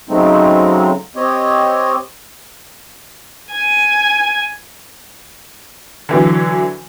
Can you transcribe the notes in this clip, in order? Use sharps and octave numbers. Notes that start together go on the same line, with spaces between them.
C#3 F#3 G#3 A3 C4 D#4
C4 G4 C#5 D#5
G#5
D3 E3 F#3